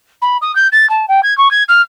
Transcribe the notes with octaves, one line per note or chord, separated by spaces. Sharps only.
B5
D#6
G6
A6
A5
G5
G#6
C#6
G#6
F6